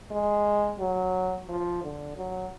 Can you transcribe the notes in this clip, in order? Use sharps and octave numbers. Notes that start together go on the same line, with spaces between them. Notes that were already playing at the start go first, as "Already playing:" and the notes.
G#3
F#3
F3
D3
F#3